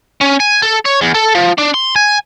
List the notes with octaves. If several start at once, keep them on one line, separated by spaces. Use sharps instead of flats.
C#4
G#5
A4
C#5
E2
A4
F3
D4
C6
G#5